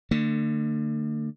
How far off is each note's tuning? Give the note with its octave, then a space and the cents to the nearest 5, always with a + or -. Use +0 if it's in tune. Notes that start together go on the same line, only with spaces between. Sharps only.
D3 +25 A3 +45